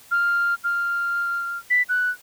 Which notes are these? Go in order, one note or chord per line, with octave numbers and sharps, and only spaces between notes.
F6
F6
B6
F#6